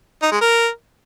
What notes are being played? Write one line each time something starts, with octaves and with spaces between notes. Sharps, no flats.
D#4
G#3
A#4